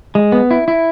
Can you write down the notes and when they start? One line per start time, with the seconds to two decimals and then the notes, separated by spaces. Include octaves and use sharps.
0.15 G#3
0.32 B3
0.51 E4
0.68 E4